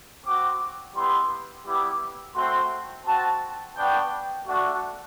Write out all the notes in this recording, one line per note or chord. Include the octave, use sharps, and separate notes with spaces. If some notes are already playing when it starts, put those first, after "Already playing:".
C4 F#4 D6
G3 B3 E4 G4 C6
G3 B3 E4 G4 D6
A3 C4 F#4 C6
C4 F#4 A5
B3 D4 F#4 G5
A3 D4 F#4